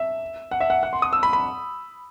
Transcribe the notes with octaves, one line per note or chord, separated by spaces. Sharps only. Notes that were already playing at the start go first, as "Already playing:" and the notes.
Already playing: E5
F#5
E5
F#5
F#5
C6
D#6
E6
B5
B5